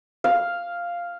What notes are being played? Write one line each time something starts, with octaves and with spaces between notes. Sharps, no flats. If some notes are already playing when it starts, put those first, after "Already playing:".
F5